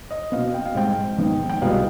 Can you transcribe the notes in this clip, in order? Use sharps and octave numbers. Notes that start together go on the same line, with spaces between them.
D#5
B2 B3 F5
G5
F5
G#2 G3 C4 G5
G#2 D#3 B3
G5
C2 B2 G#3 B3 F5